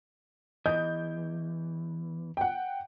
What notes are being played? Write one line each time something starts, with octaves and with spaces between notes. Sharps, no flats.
E2 E3 D#5 G6
F#5 G5